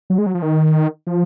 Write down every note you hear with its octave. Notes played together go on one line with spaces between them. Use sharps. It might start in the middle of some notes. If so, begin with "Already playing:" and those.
F#3
G#3
F#3
F3
D#3
F3